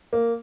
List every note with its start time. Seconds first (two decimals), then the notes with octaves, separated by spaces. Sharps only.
0.13 A#3